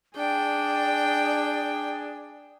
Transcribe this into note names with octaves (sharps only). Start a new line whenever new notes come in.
D4 G#4 D5 G5